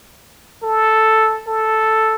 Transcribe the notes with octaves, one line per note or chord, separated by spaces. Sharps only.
A4
A4